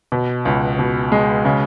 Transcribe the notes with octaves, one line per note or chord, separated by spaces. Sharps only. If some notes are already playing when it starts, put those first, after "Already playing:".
B2
C#2
B2
G#3
C#3